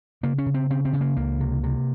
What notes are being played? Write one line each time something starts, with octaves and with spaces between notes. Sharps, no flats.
C#3 A#3
C#4
C#3
C4
C#3 C4
C4
C#3
A#3
C#2 A#3
C3
C3